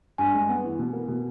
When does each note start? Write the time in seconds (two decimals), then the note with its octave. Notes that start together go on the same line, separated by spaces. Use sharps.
0.18 G2 G#5
0.34 G#3
0.49 B3
0.64 E3
0.79 B2
0.93 A#3
1.08 B2